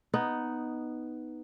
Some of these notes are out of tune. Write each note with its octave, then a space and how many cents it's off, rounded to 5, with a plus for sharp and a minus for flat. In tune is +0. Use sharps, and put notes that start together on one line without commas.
B3 +0 D#4 +0